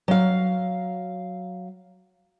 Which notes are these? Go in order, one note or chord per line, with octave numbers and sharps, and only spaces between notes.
F#3 F5